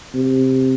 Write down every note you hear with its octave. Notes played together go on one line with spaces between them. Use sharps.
C3